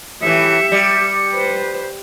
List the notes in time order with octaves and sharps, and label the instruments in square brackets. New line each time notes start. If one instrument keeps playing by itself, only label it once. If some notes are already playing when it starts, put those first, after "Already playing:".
[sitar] A2 E3 [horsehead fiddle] G4 E5 [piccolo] C#7
[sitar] G3 [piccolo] C#7
[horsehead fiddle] B4 C5